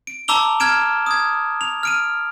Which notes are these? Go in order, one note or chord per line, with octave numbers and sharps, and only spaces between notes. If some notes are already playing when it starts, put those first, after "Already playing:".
D7
A5 A#5 D6 E6 F7 G7
A#5 F6 G#6 D7 E7
D#6 G#6
F7
F6 D7 D#7